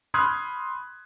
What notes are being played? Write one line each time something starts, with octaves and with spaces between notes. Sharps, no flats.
B5 C6 D#6 F6 F#6 G#6